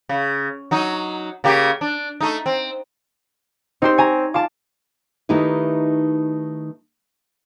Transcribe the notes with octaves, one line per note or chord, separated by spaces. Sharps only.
C#3
F#3 D#4
C#3 A#3 G4
D4
A3 D#4
C4
C4 D#4 G4 C5
C#5 G#5 A#5
F4 A5 D6
D#3 A3 D#4 E4 G4 B4